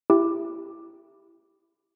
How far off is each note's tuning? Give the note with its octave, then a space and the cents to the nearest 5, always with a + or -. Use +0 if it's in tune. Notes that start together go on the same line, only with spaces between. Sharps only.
E4 +20 G4 +0